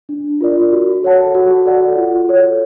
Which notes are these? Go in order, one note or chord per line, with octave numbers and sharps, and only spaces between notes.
D4
F4 A#4 D5
F#4
A4 C#5 F#5 A5
F#4
A4 D5 F#5
F4
A4 C#5